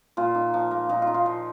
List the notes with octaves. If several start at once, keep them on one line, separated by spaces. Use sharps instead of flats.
A#2 F4
D#4
F3
A#3
A#2 D#4
F4
D#4
F4
F3